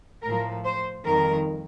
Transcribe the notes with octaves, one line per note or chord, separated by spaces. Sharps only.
A2 F3 A#4
C5
F2 D#3 G3 A#4